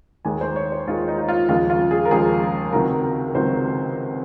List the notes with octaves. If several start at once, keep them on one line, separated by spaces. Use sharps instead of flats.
D#2 D#3 G#3 G#5
C5
C#5
C5
D#2 D#3 G#3 F4
D#4
D#4
F4
D#2 C#3 F3 G#3 F4
F4
G#4
A#4
D#2 C#3 F3 G#3 G#4
C#2 C3 D#3 F#3 A#4
A#4
C#2 C3 D#3 F#3 C5